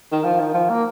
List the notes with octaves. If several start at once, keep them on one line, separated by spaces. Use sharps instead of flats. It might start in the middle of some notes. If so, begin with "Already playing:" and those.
D#3
F3
D#3
F3
A#3